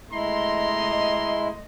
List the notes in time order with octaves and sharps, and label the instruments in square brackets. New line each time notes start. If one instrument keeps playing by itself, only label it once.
[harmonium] G#3 E4 [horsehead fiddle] A3 D#5 [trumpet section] A#5 C6